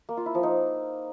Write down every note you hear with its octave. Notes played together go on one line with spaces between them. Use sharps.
A#3
F4
E4
F3
D#4